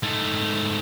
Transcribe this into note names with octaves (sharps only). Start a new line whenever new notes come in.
G#2 A3